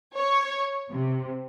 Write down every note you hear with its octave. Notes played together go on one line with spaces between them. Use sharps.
C#5
C3